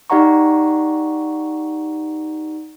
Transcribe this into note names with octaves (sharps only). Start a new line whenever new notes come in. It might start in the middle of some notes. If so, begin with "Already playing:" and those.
D#4 G4 D5 F#5 A#5 C#6